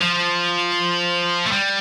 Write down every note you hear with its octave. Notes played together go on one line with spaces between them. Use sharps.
F3
A3
G3